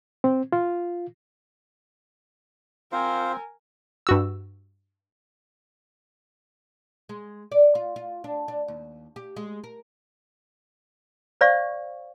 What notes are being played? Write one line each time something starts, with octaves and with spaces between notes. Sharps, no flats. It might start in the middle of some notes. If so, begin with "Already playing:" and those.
C4
F4
C4 F4 A#4 C5 G#5
G2 F#4 E6
G#3
D5
F4
F4
D4
D4
D#2
G4
G#3
A#4
C5 D5 F5 C#6